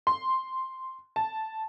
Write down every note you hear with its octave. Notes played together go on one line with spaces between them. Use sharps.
C6
A5